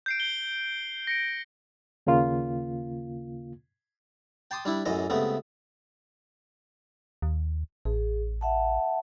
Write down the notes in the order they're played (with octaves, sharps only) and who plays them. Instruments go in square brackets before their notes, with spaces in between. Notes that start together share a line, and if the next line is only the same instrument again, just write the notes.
[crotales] G6 C7 D7
G7
A#6 C#7 D7
[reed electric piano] D#2 C#3 A#3 F4
[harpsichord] G5 A5 C6 D6 D#6
G3 D4 E4
A1 F#2 E3 D#5
C#2 C3 A3 B3
[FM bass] D#2
[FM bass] A1 [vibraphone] G#4
[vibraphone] E5 F#5 A5